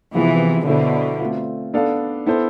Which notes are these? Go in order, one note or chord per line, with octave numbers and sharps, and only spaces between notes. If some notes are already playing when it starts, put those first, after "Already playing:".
C3 E3 F3 B3 F4 G#4
B2 D3 B3 E4 A4 C5 E5
A3 C4 F4
B3 D4 A4 D5 F5
B3 E4 A4 C5